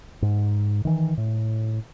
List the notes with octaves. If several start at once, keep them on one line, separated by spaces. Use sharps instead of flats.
G#2
D#3 E3
A2